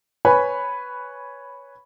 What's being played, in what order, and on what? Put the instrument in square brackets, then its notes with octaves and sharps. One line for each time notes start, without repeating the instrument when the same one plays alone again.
[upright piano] B4 C#5 G#5 B5